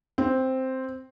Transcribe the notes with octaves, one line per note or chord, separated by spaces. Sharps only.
C4